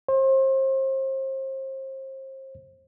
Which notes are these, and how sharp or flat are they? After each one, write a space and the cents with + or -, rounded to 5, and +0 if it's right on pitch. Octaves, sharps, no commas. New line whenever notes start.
C5 +35